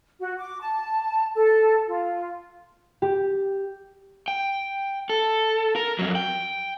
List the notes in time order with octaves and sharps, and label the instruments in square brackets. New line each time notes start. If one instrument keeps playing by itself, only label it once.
[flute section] F#4
D6
A5
A4
F4
[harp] G4
[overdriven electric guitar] G5
A4
A#4
F2 F#3
G5